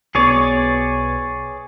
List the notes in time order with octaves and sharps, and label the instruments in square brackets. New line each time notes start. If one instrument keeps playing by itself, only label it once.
[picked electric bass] B1 B3 [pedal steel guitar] G#4 C#5 D5